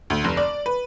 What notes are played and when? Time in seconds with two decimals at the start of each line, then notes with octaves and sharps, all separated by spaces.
0.10 D2
0.24 F1
0.37 D5
0.66 B4